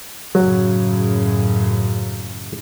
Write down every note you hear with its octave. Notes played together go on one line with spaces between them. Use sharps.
F#2 A2 C#3 F#3